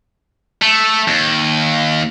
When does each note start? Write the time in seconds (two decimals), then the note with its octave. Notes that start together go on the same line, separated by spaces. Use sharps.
0.62 A3
1.08 D#2